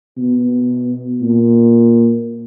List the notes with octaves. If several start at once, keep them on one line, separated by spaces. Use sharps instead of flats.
B2
A#2